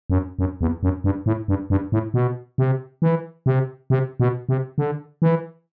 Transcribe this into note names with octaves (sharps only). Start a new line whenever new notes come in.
F#2
F#2
E2
F#2
G2
A2
G2
G2
A2
B2
C3
E3
C3
C3
B2
C3
D3
E3